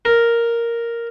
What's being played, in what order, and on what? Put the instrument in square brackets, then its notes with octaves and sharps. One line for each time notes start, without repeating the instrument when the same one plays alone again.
[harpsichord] A#4